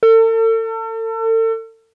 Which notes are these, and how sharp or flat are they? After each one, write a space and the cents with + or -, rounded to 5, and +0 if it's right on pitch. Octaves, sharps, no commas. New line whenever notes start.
A4 +40